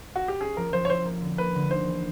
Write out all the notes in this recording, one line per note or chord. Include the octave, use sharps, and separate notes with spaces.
F#4
G4
C#4 G#4
F3 A#4
F3 C5
C#5
E4 C5
A#3
D3
A#3 B4
D3
D#4 C5
E3